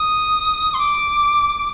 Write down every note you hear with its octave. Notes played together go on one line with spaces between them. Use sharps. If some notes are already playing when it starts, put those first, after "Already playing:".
Already playing: D#6
C6
D6